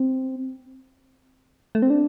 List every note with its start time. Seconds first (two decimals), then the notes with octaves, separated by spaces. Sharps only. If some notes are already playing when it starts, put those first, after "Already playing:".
Already playing: C4
1.75 A3
1.82 C4
1.90 D4